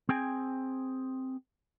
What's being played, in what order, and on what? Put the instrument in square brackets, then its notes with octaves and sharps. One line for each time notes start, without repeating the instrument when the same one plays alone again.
[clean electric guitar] C4 G#4 G5 G#5